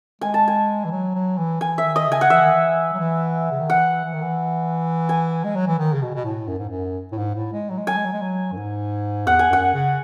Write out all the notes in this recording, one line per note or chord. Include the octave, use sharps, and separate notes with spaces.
G#3 G#5
A5
G#5
E3
F#3
F#3
E3
E3 G#5
E5
D#3
D#5
C#3 G#5
F#5
E3 E5
D#3
E3
F#3
E3
C#3
D#3
E3 F#5
E3
D#3
E3
G#5
G#3
F#3
E3
D#3
C#3
B2
B2
A2
F#2
G#2
F#2
A2
G#2
A2
G#3
F#3
G#3
F#3 G#5
G#3
F#3
G#3
F#3
F#2
G#2
E2 F#5
G#5
F#2 F#5
C#3